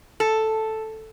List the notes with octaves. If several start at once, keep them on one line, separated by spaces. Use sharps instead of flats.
A4